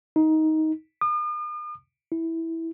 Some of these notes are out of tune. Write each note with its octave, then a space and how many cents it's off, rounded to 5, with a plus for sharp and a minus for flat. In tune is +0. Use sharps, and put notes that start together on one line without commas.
D#4 +15
D#6 -45
E4 -10